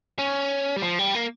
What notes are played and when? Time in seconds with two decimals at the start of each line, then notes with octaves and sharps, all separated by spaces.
0.19 C#4
0.76 G3
0.82 F3
0.99 G3
1.15 A#3